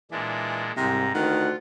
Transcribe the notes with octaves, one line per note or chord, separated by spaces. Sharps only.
A#2 E3 G#3 D4
C2 G#2 C3 A#5
D2 D#3 F4 F#5